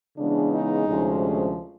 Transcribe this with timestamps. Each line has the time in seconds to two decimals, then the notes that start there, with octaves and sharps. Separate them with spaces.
0.18 C#3 E3 G#3 B3 D4
0.53 D#4
0.87 D2 C3 F3 G#3 C#4